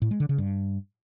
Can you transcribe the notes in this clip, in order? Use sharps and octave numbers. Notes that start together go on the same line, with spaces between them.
A2
G#3
D3
C#3
G2